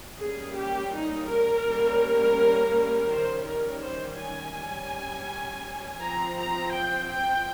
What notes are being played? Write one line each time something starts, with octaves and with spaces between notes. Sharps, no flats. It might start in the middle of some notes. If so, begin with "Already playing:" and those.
G3 A#3 C#4 G#4
G4
D#4
A#4
G3 A#3 C#4
D#3 G3 C#4 C5
A#4
C5
G#5
G3 C#4
F3 C4 A#5
A#5
G5
G5